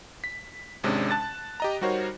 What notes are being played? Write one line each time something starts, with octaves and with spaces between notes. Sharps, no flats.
B6
G#1 C3 G#3 C#4 D4
A5 F#6 A6
G4 D#5 A#5
G3 D#4 F#4 A#4 C5 C#5